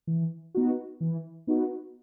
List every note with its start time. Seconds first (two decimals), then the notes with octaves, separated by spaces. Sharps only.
0.07 E3
0.55 B3 D#4 F#4
1.01 E3
1.47 B3 D#4 F#4